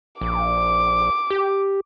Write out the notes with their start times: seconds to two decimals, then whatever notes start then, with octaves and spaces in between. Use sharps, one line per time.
0.21 A#1 D6
1.30 G4